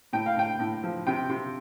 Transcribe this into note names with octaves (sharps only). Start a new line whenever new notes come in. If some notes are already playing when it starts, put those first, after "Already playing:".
A2 G5
F5
A2 G5
A2
F3
C3 G5
C3